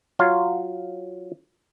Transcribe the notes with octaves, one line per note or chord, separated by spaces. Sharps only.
F#3 F4 C#5 F5